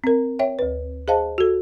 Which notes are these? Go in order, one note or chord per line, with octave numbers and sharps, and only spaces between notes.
C4 A#4
C#5 E5 G5
D2 B4
G#4 C5 D#5 F5 A5
F#4 A4